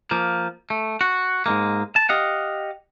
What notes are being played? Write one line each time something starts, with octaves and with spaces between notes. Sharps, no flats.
F3 A#3
A3
F#4
G#2 G#3 A#3
A5
G4 D#5 F5 F#5